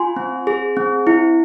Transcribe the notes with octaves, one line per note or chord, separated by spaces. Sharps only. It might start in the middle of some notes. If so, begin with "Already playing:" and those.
Already playing: F4 G#5 C6
C4
G#4
C4
E4